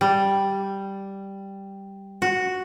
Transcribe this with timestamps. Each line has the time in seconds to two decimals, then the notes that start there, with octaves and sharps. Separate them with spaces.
0.01 G3
2.22 F#4